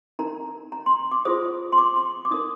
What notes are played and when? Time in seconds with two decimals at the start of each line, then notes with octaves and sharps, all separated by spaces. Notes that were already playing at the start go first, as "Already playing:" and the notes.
0.19 D#4 A#4 A#5
0.72 A#5
0.86 C6
0.99 C6
1.11 D6
1.25 F4 G#4 C5 D#6
1.72 C6
1.78 D6
1.96 C6
2.25 D6
2.31 D#4 A#4 D#6